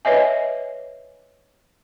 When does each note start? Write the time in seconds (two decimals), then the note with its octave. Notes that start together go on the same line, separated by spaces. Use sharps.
0.05 B4 C#5 D#5 E5 G#5